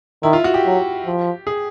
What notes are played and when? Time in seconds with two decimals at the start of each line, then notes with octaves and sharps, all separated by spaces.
0.23 D#3 E4
0.33 F4
0.44 F#4
0.54 G4
0.65 F#3
1.06 F3
1.47 G#4